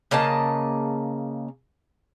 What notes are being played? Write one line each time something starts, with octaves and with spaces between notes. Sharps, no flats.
C#3 A#3 D#5 A5